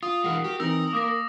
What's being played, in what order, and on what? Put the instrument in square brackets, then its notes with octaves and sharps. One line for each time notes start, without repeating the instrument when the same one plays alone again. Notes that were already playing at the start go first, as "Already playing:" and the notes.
[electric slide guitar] F4 [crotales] D#6
[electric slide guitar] E3 G#3 [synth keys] A#4 F5 F#5
[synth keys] F#4 [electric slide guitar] G4
[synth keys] E3 C4 D#4 [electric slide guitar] A#4 [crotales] E6
[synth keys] A#3 [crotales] D6 D#6 A#6